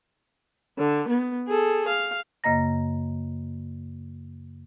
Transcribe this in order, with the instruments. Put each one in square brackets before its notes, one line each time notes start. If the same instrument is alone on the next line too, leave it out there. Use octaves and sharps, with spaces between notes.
[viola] D3
B3
G#4 A4
F5
[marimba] F#2 C#3 A#3 D#5 A#5 A#6